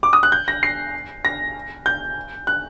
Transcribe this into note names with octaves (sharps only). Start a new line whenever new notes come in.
D6
D#6
F#6
G6
A#6
C7
A#6
G6
F#6